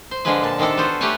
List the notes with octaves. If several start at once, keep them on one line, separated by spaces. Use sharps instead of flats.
C5
D3 F3 G#3 G#4 B4
A#2 A5
C3 D#3 G#3 D4 A4
B3 F4 F#4 C5
A3 G4 B4 C#5 F#5 G#5